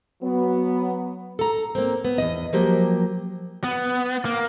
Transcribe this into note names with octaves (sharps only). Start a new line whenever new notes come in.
F#3 B3
A4 A#5
A#3 C4
B3
E2 G2 D#5
F3 F#3 A#3 G4
B3
A#3